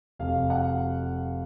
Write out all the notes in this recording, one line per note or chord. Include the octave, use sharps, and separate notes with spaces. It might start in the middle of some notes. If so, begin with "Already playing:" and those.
F1 F5
F#5